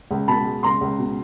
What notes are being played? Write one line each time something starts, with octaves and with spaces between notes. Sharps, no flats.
C#2
B2 A5 B5
G#3
C#2 A#5 C6
C#2
B2